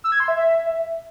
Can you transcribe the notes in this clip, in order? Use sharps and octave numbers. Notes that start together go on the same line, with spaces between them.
E6
G#6
C6
E5